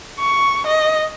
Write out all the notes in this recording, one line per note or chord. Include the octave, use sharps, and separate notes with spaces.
C#6
D#5